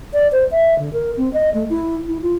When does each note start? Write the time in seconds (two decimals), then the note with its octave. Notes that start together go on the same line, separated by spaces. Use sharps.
0.14 D5
0.32 C5
0.51 E5
0.79 D3
0.93 A#4
1.17 C4
1.34 D#5
1.54 A3
1.70 E4
2.08 E4
2.22 F4